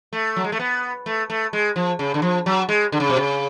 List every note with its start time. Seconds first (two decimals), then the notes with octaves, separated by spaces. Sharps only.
0.13 A3
0.36 F#3
0.44 G#3
0.52 A3
0.59 B3
1.06 A3
1.30 A3
1.53 G#3
1.76 F3
1.99 C#3
2.14 D3
2.22 F3
2.46 F#3
2.69 G#3
2.92 D3
3.00 C#3
3.09 B2
3.17 C#3